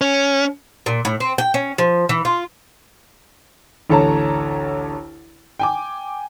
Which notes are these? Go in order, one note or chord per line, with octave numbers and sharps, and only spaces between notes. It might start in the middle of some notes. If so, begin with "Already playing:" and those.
C#4
A#2
A2
C4
G5
C#4
F3
E3
F4
A1 D2 A4 C#5 A5 A#5
G5 G#5 D6